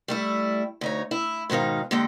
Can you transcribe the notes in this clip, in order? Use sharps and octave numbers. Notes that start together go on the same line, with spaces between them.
G3 A3 E4
D2 D#4 C#5
E4
G#2 B2 D#3 D#4 F5
D3 G#3 A#3 G4 G5